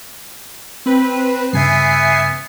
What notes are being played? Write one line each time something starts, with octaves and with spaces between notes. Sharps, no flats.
C4 B4
G2 C#3 B3 E5 G#5 C7